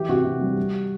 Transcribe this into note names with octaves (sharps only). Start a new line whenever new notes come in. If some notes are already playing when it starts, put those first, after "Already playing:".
Already playing: E3 G4
C3 F#4
C3
G3
G3